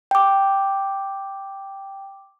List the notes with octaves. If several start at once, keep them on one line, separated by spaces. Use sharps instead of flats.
G5 D6